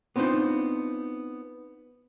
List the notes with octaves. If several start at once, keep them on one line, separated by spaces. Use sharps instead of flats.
B3 C4 D4 D#4 F4 C5